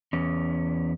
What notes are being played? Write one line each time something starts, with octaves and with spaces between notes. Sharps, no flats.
E2 C#4